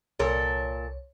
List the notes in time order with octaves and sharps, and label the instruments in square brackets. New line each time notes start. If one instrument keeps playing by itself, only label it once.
[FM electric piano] C2 C#5 [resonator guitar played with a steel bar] A#2 A4 A#4